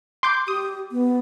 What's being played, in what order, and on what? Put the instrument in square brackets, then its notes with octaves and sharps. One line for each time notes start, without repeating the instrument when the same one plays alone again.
[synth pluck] C6 D6 G6
[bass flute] G4 [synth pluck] D#6
[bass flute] B3